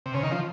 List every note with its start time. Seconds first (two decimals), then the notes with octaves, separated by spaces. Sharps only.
0.06 C3
0.14 C#3
0.23 D#3
0.32 F3